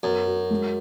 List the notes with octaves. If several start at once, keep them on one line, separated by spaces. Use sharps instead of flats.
F#2 B3
F#4
G#3